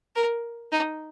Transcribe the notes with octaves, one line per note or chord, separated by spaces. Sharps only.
A#4
D#4